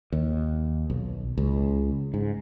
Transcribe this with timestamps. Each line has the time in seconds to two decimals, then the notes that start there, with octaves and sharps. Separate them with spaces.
0.12 D#2
0.90 B1
1.38 C#2
2.14 G#2